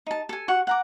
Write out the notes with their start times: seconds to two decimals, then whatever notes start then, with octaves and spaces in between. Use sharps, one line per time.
0.07 D#4 A5
0.29 A4 G#5
0.48 F#4 F#5 C#6
0.67 F#5 A#5 D6